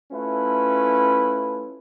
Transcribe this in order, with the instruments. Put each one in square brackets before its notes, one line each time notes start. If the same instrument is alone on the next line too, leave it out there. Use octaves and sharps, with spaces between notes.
[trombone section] A3 C#4 E4 F4 B4